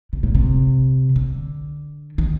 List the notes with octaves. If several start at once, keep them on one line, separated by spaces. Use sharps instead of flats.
C3
A#2
C3
D3
D#3